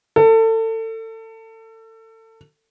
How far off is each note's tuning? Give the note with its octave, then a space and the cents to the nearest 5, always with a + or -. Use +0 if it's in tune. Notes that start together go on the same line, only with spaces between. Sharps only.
A4 +30